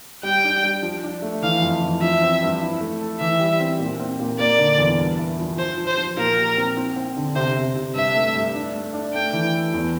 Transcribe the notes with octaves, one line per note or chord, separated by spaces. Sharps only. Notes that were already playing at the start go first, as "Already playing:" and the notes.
G3 G5
D4
G3
F3
D4
A3
E3 F5
F2
E3
F3 E5
C4
G2
E4
A3
A4
E3 E5
G3
C4
A#2
C4
A#2
A#3 D5
D3
E2
G2
E4
F3
F3 C5
F3
C5
F3
A#2 A#4
G4
C4
C4
C4
D3
C3 C5
C3
C3
G2 E5
A3
G2
D4
A3
D4
A3 G5
E3
A4
E2